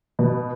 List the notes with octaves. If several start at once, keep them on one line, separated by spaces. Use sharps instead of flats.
B2